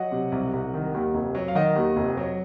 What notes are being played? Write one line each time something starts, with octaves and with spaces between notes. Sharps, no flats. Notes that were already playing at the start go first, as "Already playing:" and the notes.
Already playing: F#3 D#5 F#5
C3
C2
C2
D#3
D#2
F1
F#3
F5
D#3 D#5 F#5
D#2
F1
F#3